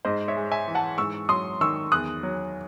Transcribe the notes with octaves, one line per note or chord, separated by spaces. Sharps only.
G#2 C5 D#5
C#5 E5
G#3
E5 G#5
E3
F#5 A5
G#2 C#6 E6
F#3 C6 D#6
D#3 C#6 E6
E2 D#6 F#6
F#3